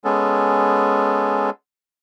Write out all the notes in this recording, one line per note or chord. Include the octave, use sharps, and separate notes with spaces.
G#3 B3 C#4 A4